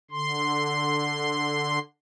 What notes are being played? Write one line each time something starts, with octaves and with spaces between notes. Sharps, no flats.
D3 C6